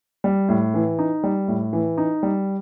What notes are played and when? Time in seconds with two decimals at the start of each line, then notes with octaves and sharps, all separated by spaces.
0.24 G3
0.49 A2
0.74 E3
0.99 D#4
1.24 G3
1.48 A2
1.73 E3
1.98 D#4
2.23 G3